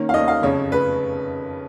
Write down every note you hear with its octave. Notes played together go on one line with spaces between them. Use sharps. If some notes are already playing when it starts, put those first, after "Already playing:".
Already playing: D#3 A#3 C#4
F5
D#2 D#3 A#3 C#4 D#5
F5
F#1 F2 C#3 C#5
C#3 B4